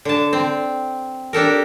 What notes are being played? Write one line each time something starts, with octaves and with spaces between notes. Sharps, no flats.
D3 A5
C4
D4 G4 A4 A#4